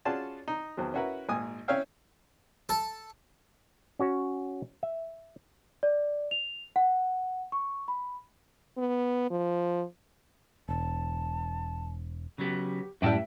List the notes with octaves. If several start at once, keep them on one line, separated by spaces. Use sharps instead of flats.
C#4 F4 F#4 G#4 D5 A5
D#4
E2 D#3 F3 F#3
C#4 E4 F#4 A#4 B4
G#1 A#2 G#5 D#6
C#4 E4 C#5 E5 F5 G5
A4
C#4 F#4 C#5
E5
D5
F7
F#5
C#6
B5
B3
F3
E1 A5
C#3 F#3 B3 G4
F#2 A2 G3 B4 E5 G5 A5